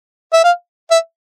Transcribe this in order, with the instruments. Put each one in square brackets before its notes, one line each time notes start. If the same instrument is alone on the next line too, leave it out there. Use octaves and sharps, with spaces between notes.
[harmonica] E5
F5
E5